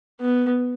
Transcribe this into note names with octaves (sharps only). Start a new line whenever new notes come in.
B3